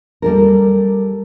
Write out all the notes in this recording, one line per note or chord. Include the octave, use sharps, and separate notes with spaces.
G3 A4 A#4